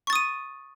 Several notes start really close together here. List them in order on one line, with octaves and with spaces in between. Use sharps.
C#6 A6 D#6 D#7